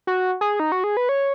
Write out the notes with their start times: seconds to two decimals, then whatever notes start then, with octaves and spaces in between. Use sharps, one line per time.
0.07 F#4
0.41 G#4
0.60 D#4
0.72 F#4
0.84 G#4
0.97 B4
1.09 C#5